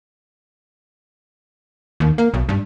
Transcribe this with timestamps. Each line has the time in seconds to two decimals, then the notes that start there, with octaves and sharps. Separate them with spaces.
2.00 D#2
2.18 A#3
2.34 B1
2.49 G2